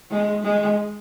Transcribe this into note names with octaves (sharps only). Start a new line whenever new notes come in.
G#3
G#3